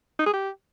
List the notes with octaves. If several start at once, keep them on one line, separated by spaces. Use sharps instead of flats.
D#4
G#4
G4